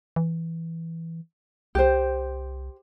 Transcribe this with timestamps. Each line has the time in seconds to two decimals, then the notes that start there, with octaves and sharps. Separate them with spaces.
0.16 E3
1.75 C2 G4 C5